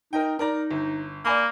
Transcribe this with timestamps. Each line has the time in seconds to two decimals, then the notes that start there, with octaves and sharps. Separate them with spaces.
0.13 D#4 A#4 D#5 G5
0.39 D#4 A#4 D5 A#5
0.71 G1
1.25 A#3 D5 G#5 B5